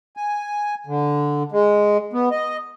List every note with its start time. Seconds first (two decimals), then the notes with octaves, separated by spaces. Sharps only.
0.17 G#5
0.87 D3
1.52 G#3
2.13 B3
2.31 D#5